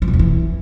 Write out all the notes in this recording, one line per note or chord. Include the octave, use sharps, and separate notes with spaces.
G2
B2
F2
E3